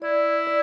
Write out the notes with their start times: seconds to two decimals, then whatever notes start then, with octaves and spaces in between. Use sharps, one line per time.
0.02 E4 D5
0.47 D5